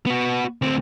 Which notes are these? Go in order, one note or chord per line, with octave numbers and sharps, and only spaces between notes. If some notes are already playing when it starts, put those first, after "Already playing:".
B3 F#4
D2 C4